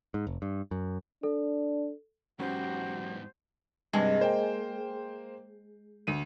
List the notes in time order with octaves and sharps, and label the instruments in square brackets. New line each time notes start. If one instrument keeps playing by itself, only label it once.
[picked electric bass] G#2
F1
G2
F#2
[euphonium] D4 [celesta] A4
[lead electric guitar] E2 G#2 [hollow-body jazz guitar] F#3 C#4 B5 [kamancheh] F#4 G4 [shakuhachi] C5
[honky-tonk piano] G2 C3 [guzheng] G#3
[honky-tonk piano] A#3 C5 G5
D2 D#7